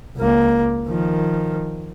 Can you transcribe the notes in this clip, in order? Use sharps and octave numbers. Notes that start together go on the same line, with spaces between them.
C#2 A#3
D#3 F3